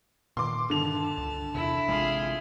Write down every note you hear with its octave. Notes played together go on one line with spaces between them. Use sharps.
A#2 D#3 C6 D6
G2 D3 D#3 A5 F7
C#2
E2 C3 E4
A1 C3 G#3 F4 G#4